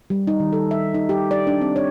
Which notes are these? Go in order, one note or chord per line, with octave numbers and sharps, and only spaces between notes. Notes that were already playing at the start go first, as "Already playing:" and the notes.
G3
D#4
D#3
A4
E5
D#4
G4
D5
D4
C4
C#5